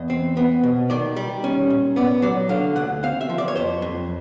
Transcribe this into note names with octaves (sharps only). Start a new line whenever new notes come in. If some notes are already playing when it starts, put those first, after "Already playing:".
Already playing: E2 D#5
C4
B3
B2
D#3 D5
G3
C#4
A#2
B3 D5
F#3 D5
D3 F5
D2 F#5
C4 F5
E5
F3
D5
C#5
F2 C5
F2